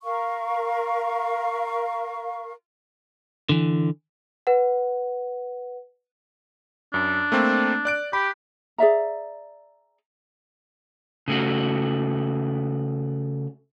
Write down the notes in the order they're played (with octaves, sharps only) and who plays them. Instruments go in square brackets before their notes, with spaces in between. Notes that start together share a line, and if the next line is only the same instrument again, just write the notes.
[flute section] A#4 F5 C#6
[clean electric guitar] D3 E3
[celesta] B4 F#5
[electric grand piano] F#2 [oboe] D4
[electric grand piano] A3 A#3 C4
D5 F#6 D7
[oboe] G4 [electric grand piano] B5
[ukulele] G#4 D5 E5 A#5
[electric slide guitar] C#3 A3 F#4